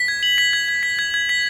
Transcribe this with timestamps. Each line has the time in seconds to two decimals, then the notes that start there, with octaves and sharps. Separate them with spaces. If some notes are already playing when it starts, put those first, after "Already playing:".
Already playing: B6
0.08 G#6
0.23 F#7
0.38 B6
0.53 G#6
0.68 G#6
0.83 B6
0.99 G#6
1.14 G#6
1.29 B6